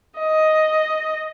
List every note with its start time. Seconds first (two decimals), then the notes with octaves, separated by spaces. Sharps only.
0.19 D#5